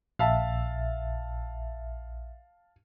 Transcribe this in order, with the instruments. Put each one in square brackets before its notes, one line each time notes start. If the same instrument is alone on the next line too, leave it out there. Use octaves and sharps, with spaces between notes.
[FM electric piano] A#1 E5 [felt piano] F5 A5